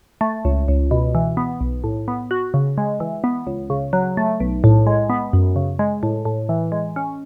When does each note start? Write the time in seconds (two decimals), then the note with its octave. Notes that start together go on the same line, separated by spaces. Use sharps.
0.21 A3
0.45 C#2
0.68 C#2
0.91 B2
1.15 E3
1.37 B3
1.61 B1
1.84 A2
2.08 B3
2.31 F#4
2.54 C#3
2.78 G#3
3.00 E3
3.24 B3
3.47 C#2
3.70 C#3
3.93 F#3
4.17 A3
4.40 B1
4.64 A2
4.87 G#3
5.10 B3
5.33 F#2
5.56 C#3
5.79 G#3
6.03 A2
6.25 A2
6.49 E3
6.72 G#3
6.96 C#4